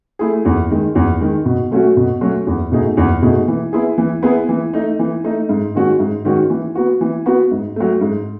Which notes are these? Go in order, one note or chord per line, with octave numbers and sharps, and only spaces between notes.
A3 E4 G#4
E2
D#3 G#3
E2
D#3 G#3
B2
F#3 A3 C#4 F#4
B2
F#3 A3 C#4 F#4
E2
B2 A3 D#4 G#4
E2
B2 A3 D#4 G#4
E3
B3 E4 G#4
E3
B3 E4 G#4
E3
A3 D#4
E3
A3 D#4
G#2
D#3 G#3 C#4 F#4
G#2
D#3 G#3 C#4 F#4
E3
B3 F#4
E3
B3 F#4
G#2
F#3 A3
G#2